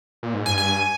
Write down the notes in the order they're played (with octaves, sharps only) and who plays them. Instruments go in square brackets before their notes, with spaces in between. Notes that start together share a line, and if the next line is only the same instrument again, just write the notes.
[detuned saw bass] A#2
G#2
[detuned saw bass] G2 [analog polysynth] G#5
[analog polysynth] G#5